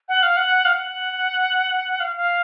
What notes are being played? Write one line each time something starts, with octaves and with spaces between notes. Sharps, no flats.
F#5
F5
F#5
F5
F#5
F5
F5